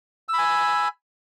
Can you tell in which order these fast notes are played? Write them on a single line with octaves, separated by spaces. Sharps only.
E6 B5 G#5